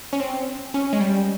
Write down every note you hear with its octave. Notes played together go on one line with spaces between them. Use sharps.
C#4
C4
C#4
G#3
G3